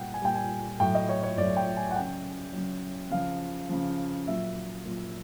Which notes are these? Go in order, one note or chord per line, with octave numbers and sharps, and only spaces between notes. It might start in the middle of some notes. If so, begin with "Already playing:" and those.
Already playing: A#2 G3 F#5 G5
G#5
A#2 G3 G5
G#5
A2 F#3 G5
D#5
C#5
C#5
A2 F#3 D5
G5
G#5
F#5
C#3 F#3 G5
C#3 F#3
C#3 F3 F5
C#3 F3
A#2 F#3 E5
A#2 F#3